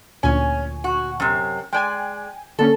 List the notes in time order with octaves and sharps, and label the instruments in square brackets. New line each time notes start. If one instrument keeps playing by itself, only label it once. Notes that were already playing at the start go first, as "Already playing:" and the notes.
[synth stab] D2 A#2 G#5 [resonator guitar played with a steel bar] C#4
[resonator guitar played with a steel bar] F#4
F#2 C3
[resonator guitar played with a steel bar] G#3 D5 [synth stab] G5 G#5
[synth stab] D3 A#3 C#4 [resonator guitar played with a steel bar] A4